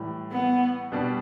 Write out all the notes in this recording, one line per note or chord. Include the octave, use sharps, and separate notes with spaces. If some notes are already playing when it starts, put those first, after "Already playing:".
Already playing: A2 E3 G3
B3
B2 G3 B3 D4